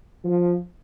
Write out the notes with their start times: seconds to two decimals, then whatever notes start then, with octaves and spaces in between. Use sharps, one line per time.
0.24 F3